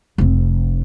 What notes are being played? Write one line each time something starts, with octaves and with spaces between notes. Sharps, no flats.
F1 C4